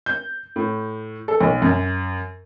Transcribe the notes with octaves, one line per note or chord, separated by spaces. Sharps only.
G6
A2
A4
B1
F#2